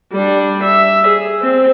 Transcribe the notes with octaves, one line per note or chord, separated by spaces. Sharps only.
G3 D4
E5
G#4
C4